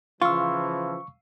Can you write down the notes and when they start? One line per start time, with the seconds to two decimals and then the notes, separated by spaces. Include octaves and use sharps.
0.22 C#3 E3 F3 F4 F5 C#6 E6